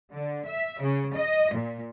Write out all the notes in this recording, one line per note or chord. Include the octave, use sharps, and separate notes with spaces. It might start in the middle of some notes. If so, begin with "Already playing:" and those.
D3
E5
C#3
D#5
A#2